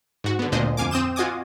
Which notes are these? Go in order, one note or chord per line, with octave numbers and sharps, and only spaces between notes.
G#2 F#4
D3 B3
D2 A#2 D4 C5 D#5
F2 F5 G#5 D6
C4 D#6 G6 E7
F4 F#4 D#5 G#5 D6 D#6